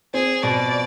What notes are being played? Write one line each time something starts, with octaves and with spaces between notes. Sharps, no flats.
C4 G#4
B2 D5